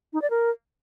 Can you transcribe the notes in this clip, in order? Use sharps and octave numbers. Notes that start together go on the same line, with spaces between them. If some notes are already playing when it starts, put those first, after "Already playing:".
D#4
D5
A#4